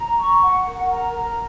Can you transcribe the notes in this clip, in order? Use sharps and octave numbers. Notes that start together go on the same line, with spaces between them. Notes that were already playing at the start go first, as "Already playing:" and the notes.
Already playing: A#5
C#6
F#5
A#4
A#5
A#4